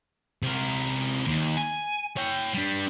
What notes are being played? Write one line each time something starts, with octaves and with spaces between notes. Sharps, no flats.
C3 A#4
D#2
G#5
C#5 G5
G3 D4